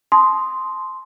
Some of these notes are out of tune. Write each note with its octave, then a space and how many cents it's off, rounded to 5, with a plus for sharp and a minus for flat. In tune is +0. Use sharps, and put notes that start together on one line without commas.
A5 -25 C6 +0 D#6 +0